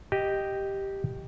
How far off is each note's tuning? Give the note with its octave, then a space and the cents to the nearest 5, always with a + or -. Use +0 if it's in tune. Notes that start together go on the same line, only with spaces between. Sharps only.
G4 +0 D#5 +0